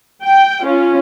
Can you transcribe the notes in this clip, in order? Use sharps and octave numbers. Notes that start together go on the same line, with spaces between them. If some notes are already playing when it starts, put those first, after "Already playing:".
G5
C#4 F4